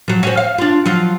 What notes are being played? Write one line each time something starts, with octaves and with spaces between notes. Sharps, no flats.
F3 F#3
C#4 F#4 C5
F5
D4 F4
F3 F#3 F4